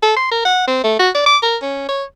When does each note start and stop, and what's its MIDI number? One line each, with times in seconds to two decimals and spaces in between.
0.03 0.14 69
0.17 0.31 84
0.31 0.41 70
0.45 0.63 78
0.67 0.82 60
0.84 0.99 57
0.99 1.10 66
1.15 1.25 74
1.26 1.38 86
1.42 1.57 70
1.62 1.87 61
1.89 2.04 73